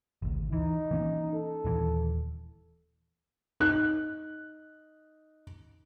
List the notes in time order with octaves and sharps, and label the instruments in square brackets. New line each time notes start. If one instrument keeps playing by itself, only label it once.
[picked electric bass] G#1 D2
[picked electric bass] E3 [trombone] D#4
[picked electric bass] E3 A#3 C#4
[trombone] A4
[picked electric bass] D#1 D#2 E3
[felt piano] D#4 F#6